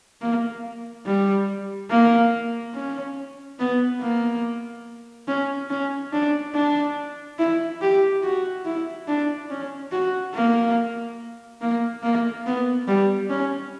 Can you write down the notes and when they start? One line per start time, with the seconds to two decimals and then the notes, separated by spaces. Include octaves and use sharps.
0.21 A#3
1.06 G3
1.90 A#3
2.75 C#4
3.59 B3
4.01 A#3
5.28 C#4
5.70 C#4
6.13 D4
6.54 D4
7.39 E4
7.81 G4
8.23 F#4
8.65 E4
9.08 D4
9.50 C#4
9.92 F#4
10.35 A#3
11.61 A#3
12.03 A#3
12.46 B3
12.88 G3
13.30 C#4